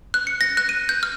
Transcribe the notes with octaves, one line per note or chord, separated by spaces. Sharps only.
F#6
C#7
A#6
F#6
D#7
G6
F6